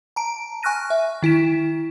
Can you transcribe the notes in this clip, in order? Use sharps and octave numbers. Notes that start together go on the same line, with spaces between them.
A5 A#5 D7
G#5 C#6 F6 F#6 A#6 D#7
E5
D#3 E4 B6 E7